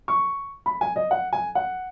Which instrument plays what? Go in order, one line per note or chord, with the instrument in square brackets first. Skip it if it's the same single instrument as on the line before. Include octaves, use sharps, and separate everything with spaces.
[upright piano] C#6
B5
G#5
D#5
F#5
G#5
F#5